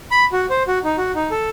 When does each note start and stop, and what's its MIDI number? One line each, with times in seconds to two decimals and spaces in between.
0.11 0.25 83
0.32 0.46 66
0.50 0.63 72
0.68 0.79 66
0.84 0.96 63
0.98 1.12 66
1.15 1.30 63
1.31 1.49 69